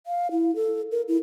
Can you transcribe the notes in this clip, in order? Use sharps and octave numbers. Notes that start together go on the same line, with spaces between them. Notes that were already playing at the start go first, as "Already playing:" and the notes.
F5
E4
A4
A#4
E4